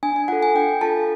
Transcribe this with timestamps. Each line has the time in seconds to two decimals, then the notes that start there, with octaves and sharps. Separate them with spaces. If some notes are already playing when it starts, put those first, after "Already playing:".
0.03 D4 G#5
0.16 G#5
0.28 F4 A4 F#5
0.43 G#5
0.55 D4 G5
0.81 F4 A4 A5